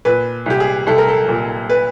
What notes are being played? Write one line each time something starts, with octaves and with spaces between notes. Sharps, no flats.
A#2 B4
C2 G4
G#4
C2 A4
A#4
A4
A#2
B4